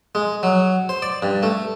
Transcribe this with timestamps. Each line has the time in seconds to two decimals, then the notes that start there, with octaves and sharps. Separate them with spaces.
0.15 G#3
0.43 F#3
0.89 C5
1.02 D5
1.22 G2
1.43 A3